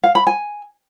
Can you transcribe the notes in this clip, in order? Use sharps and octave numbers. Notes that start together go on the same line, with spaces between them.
F5
B5
G#5